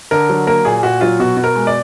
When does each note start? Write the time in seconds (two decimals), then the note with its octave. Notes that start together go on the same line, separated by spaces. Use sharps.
0.11 D3 A#4
0.30 F#3
0.47 A#3 A#4
0.65 A#2 G#4
0.83 A#2 F#4
1.01 F#3 F4
1.20 B2 F#4
1.37 B2
1.44 A#4
1.56 G#3
1.67 D5